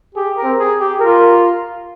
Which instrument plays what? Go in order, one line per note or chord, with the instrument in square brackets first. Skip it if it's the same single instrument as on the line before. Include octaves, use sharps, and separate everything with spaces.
[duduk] G4 [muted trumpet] G#4
[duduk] A#4
[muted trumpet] C4
[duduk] G#4
G4
[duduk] F4 [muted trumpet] A#4